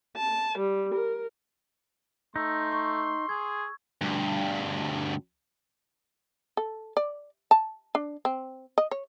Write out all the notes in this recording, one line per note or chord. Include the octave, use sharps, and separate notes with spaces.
A5
G3
A#4
A3 D#4 C6 E6
C#6
G#4 G#6
D2 G2
A4
D5
A5
D4
C4
D#5
C#5